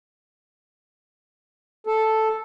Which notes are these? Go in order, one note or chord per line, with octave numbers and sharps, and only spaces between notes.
A4